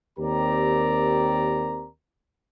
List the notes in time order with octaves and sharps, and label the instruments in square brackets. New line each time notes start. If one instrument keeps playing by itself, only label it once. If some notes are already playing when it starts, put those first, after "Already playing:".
[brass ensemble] D#2 C4 G4 A#4 D5 A#5